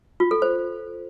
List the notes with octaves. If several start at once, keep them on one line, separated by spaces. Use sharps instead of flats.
F4
A4
C5